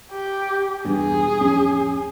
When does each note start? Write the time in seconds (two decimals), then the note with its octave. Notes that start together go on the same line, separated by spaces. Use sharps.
0.12 G4
0.85 E2 G2 B2 G#4
1.41 D1 F2 C#4